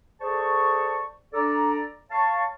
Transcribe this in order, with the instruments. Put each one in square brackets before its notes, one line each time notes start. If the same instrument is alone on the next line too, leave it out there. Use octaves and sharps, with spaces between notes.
[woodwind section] G#4 A4 C5 D5 A5 C#6
D4 A4 D5 A#5
C#5 F5 A5 C#6